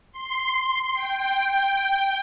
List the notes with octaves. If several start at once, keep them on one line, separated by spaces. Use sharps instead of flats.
C6
G5